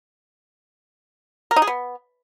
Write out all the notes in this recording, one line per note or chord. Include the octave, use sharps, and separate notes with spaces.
A#4
D#4
G#4
B3